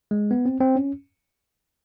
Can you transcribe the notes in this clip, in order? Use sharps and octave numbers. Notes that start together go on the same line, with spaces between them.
G#3
B3
C4
C4
C#4